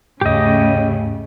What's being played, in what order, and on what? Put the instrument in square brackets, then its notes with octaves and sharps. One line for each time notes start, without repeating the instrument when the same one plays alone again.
[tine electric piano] D#2 G#2 [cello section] C#3 A3 [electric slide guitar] G4 D#5